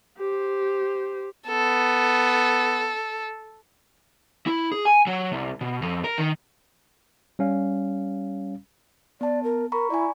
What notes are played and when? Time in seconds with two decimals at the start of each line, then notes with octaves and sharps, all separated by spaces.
0.19 G4 C5
1.47 B3 A4
4.47 E4
4.72 G#4
4.85 G#5
5.07 F#3
5.32 C2
5.61 B2
5.82 F2
6.04 A#4
6.18 D#3
7.39 G3 C#4 F5
9.21 B3 D5 A5
9.43 A#4
9.72 A#4 A#5 B5 C#6
9.90 E4 D5 G#5